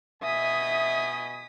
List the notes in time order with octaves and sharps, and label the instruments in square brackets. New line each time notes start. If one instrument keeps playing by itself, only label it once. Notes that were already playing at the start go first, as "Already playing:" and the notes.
[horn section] B2 D#5 G#5 [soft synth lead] E5 [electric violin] D#6 B6